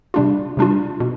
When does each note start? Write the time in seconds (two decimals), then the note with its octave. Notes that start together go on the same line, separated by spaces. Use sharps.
0.14 C3 G3 D4 F4
0.57 C3 G3 D4 F4
1.00 B2